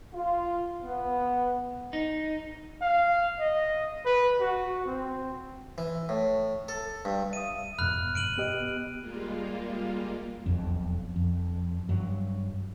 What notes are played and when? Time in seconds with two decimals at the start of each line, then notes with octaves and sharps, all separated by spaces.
0.14 F4
0.83 B3
1.93 D#4
2.81 F5
3.39 D#5
4.05 B4
4.40 F#4
4.86 C4
5.78 E3
6.09 A2
6.68 A4
7.05 G2
7.33 E5 F5 D#6 D#7
7.78 F2 G#2 B2 B5 F6 F#6
8.15 G2 B2 D7 D#7 F#7
8.38 B3 G4 D#5
9.00 G3 G#3 A#3 F4
10.46 E1 B1 F2
11.16 F2
11.89 G2 F#3